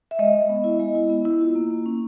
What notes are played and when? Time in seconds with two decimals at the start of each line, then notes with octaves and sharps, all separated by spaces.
0.11 E5
0.19 G#3 D#5
0.34 G#3
0.49 B3
0.64 E4
0.80 G#3
0.95 E4
1.09 B3
1.25 E4
1.41 F4
1.55 A#3
1.70 A#3
1.86 C#4